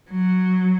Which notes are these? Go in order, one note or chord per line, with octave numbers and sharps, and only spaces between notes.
F#3